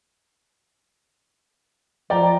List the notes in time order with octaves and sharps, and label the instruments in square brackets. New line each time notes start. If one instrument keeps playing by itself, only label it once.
[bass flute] F3 [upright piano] D5 G5 A#5